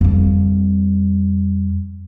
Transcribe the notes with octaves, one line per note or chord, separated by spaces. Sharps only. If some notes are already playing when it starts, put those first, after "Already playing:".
F2 G3